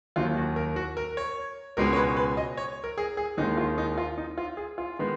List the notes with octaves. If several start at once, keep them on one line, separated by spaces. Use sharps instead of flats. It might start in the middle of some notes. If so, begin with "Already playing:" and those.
D#2 D#3 F#3 F4
F#4
A#4
F#4
A#4
C#5
C#2 B2 G#3 C#4 A#4
C#5
B4
B4
D#5
C#5
A#4
G#4
G#4
D#2 D#3 G#3 D#4
F4
D#4
F4
D#4
F4
G#4
F4
D#3 G#3 B3